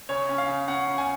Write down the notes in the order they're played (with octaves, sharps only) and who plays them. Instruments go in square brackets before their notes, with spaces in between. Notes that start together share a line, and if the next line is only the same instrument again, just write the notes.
[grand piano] C#3 C#5
C#4
F5
C#3
C#4 F#5
C#3
G#5